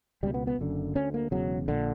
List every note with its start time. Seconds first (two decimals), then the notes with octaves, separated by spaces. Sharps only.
0.23 C#2 B2 G3
0.34 B3
0.47 B3
0.59 F#1 F#2 D3
0.95 D2 D3 C#4
1.14 A#3
1.31 E1 E2 C#3 F#3
1.68 A#1 A#2 D3